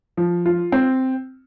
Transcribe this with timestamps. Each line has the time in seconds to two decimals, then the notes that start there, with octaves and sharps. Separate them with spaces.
0.17 F3
0.46 F4
0.72 C4